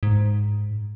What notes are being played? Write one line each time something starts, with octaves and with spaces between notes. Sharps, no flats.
G#2